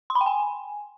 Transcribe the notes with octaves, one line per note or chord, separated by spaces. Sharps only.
C6
B5
G5
G#5